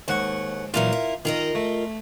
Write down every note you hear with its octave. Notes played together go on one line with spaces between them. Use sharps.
D#2 G#2 F#5 C#6
A#2 E3 F#3 F4 A#4
E4
D#3 F4 A#4 D#5
A3